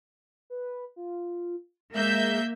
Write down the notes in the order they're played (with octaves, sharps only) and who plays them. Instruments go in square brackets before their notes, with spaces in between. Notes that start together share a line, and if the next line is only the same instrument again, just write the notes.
[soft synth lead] B4
F4
[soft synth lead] G#3 [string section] A#3 E5 G6